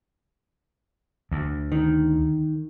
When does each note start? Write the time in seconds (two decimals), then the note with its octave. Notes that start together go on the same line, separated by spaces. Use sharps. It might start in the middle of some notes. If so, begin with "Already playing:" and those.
1.31 D2
1.72 D#3